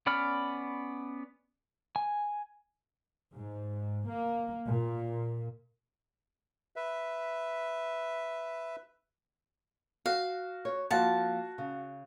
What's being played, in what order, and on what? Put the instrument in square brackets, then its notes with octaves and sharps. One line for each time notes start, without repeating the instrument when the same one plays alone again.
[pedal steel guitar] B3 C#4 D5 B5 F6
G#5
[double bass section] G#2
A#3
A#2
[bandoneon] B4 E5
[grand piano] F#4 [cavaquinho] F5
[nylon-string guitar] C#5
[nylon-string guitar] F3 A#3 C4 [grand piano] F#4 F5 F#5 [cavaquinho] A5
[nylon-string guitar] C#3